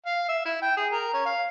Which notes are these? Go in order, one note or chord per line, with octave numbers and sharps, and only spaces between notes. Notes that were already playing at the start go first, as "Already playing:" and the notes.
F5
E5
E4
G5
G#4
A#4
C#4
F5